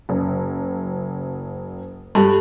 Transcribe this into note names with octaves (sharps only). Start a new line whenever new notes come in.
F#1
G2 G4 A4 A5